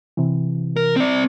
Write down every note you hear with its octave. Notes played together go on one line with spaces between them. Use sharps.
C3 E3
A#4
C4 D5